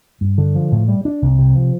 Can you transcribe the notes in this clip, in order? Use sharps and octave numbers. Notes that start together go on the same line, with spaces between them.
G2
D3
F3
A2
G3
D4
C2
C3
F3